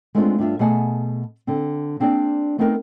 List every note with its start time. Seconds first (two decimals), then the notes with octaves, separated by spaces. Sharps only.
0.15 G#3 A3 B3 C4 D4 F4
0.38 G2 D4 F4 E5
0.59 B2 A3 G#4 F#5 G#5 A5
1.47 D3 C4
2.00 A#3 C4 D4 G#4 D5
2.58 A3 B3 C4 D#4 G#4 A#4